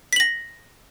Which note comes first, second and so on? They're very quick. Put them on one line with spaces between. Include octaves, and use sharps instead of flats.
B6 F#7 A#6